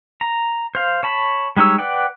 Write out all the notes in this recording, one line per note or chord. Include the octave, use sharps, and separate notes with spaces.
A#5
C5 F5
C#5 A5 B5
G3 G#3 D#4 C#5 E6
B4 D5 F#5 G5